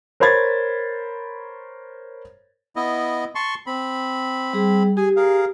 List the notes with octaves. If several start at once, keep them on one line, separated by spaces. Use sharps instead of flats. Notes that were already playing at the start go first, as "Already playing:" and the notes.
A#4 C5 C#5 B5 G#6 A6
B3 E4 D#5
A5 C6 C#6
C4 B5
G3 G#4
G4 G#4 G#5
G#4 A#4 F5